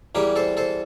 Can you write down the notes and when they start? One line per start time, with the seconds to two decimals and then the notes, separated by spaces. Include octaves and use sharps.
0.15 E2 E3 G3 G4 A#4
0.36 A4 C5
0.57 A4 C5